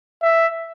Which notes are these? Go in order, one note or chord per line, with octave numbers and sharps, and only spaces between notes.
E5